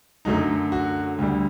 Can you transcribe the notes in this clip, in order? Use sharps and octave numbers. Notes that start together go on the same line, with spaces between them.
F#2 D3 F#3 A3 D#4
F#4
D2 D3 G3